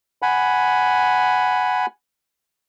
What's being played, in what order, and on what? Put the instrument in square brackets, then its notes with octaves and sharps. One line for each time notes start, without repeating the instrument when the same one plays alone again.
[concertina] F#5 G#5 B5